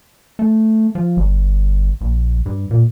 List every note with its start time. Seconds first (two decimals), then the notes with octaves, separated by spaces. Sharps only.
0.39 A3
0.95 F3
1.17 G1
2.01 A#1
2.46 G2
2.71 A#2